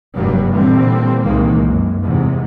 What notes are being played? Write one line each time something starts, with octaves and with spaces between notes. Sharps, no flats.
F1 G2 F#3 G3 A#3
A#2 D3 E3 G3 C4
C2 D#3 E3 G#3 A#3
F#2
E2 G#2 C3